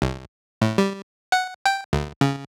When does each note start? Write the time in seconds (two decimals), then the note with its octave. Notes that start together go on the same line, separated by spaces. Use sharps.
0.02 C2
0.62 A2
0.78 G3
1.32 F#5
1.66 G5
1.93 D2
2.21 C#3